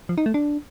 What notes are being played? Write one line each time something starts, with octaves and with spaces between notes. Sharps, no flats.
F3
D#4
A3
D4